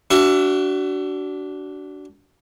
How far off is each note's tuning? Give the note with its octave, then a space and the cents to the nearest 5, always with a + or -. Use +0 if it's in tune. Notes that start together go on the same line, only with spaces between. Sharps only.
D4 -15 F#4 +25 E5 +25